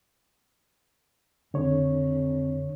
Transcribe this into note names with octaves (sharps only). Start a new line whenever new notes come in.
F2 D3 C#5